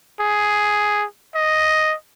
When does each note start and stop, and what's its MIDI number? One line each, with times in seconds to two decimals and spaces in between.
0.20 1.06 68
1.35 1.95 75